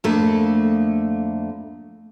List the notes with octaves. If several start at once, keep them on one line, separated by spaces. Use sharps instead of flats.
F2 D3 A3 A#3